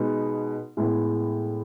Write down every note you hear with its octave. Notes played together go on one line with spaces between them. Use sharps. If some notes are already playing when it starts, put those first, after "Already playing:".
Already playing: B2 G#3 B3 D#4
A2 G#3 B3 E4